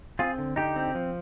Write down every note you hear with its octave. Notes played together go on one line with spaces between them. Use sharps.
C4 F4 G#4
D3
D3 D#4 G4
C4
F3